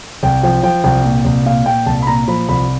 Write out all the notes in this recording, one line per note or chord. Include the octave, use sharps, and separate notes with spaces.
C2 G5
F3 G5
F3 G5
C2 G5
A#2
C2
A#2 F5
A#2 G5
C2 A5
B5
A#2 A#5
F3 B5
C2 B5